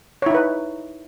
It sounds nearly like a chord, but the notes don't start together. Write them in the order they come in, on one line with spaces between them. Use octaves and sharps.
C#5 E4 D#4 B4